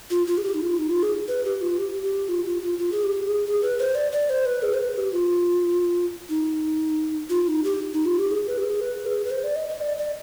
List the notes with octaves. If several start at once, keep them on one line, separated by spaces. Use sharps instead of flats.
F4
F4
G#4
G4
D#4
F4
D#4
F4
G#4
B4
G4
F4
G4
G4
F4
F4
F4
F4
G#4
G4
G#4
G#4
B4
C5
D5
D5
C5
B4
G#4
C5
B4
G4
F4
D#4
F4
D#4
G4
D#4
F4
G4
G#4
B4
G4
G#4
B4
G#4
B4
C5
D5
D#5
D#5
D5
D5